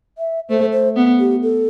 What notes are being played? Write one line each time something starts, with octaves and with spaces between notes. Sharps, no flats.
E5
A3 C5
C5
B3
G4
A4